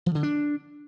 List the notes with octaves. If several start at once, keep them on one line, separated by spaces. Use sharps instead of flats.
F3
D3
D4